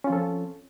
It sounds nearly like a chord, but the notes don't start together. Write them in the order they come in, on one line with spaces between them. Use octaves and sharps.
C#4 F4 F3 A4 C4